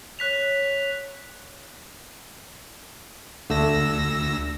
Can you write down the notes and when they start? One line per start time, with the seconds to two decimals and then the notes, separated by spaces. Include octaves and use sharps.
0.19 C#5 F#6 B6 F7
3.50 D2 D3 A3 D4 E6 A#6